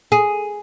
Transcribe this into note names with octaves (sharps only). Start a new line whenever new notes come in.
G#4